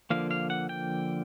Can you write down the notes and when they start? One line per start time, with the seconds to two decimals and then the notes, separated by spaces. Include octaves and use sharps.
0.10 D3 F3 A#3 F5
0.31 F5
0.50 F#5
0.69 G5